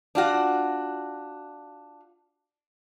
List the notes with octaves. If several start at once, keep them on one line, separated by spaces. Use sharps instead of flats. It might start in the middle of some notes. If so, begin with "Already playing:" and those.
D4 F4 F#4